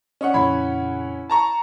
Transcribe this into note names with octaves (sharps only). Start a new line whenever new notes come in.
C#4 D5 D#5 F#5 C#6
F2 A#2 C#3 E4 C#5 B5
A5 A#5 C#6